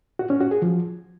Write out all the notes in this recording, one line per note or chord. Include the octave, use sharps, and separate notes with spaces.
F#4
C#4
F#4
G#4
F3